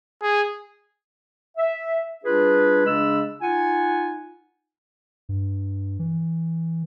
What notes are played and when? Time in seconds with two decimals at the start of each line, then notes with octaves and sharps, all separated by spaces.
0.22 G#4
1.58 E5
2.25 G3 D4 F4 G#4 B4
2.86 C#3 G#3 D4 B5 E6
3.42 D#4 F4 F#5 G#5
5.29 G2
5.99 E3